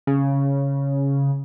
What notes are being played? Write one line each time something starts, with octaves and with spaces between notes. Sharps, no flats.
C#3